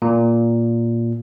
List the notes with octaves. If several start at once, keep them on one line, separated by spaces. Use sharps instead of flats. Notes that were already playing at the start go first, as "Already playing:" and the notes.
A#2